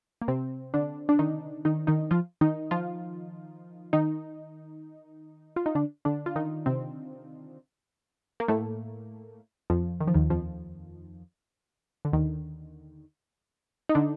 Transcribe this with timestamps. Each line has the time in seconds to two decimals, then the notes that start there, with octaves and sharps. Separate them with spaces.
0.22 A#3
0.28 C3 C4
0.74 D3 D4
1.09 D4
1.19 D#3 D#4
1.65 D#3 D#4
1.87 D#3 D#4
2.11 F3 F4
2.41 D#3 D#4
2.71 F3 F4
3.93 D#3 D#4
5.56 F4
5.66 D#4
5.75 D3 D4
6.05 D3 D4
6.26 F4
6.36 D#3 D#4
6.66 C3 C4
8.40 A#3
8.48 A2 A3
9.70 F2 F3
10.00 D#3
10.08 F3
10.14 D#2 D#3
10.30 F2 F3
12.05 D3
12.13 D#2 D#3
13.89 D#4
13.95 D3 D4